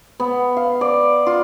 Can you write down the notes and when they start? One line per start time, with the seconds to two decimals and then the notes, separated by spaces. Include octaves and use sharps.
0.20 B3
0.57 F5
0.81 D5
1.27 F4